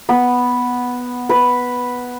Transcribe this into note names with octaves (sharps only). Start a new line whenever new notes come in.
B3
B4